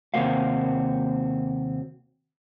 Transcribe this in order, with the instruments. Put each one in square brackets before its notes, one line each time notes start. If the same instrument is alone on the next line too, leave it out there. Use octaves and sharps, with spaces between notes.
[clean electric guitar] D#2 C3 A#3 C4 F#4 F5